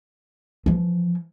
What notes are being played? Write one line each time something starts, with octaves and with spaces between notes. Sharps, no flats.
E3 F3